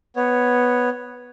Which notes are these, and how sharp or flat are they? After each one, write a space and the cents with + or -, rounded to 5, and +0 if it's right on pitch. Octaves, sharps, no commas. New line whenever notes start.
B3 +0 C#5 +0